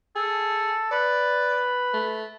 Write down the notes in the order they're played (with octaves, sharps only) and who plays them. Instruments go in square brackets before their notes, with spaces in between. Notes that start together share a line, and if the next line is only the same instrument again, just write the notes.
[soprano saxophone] G#4 [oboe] A4
[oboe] B4 [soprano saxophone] D5
[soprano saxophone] A3